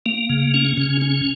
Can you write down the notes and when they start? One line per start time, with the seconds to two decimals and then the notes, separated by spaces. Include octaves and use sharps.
0.06 A#3
0.29 C#3
0.54 C#4
0.77 C#3
1.01 C#4